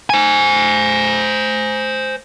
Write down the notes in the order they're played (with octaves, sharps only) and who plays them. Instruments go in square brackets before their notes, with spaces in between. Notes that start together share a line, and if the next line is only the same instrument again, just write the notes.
[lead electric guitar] C5 G#5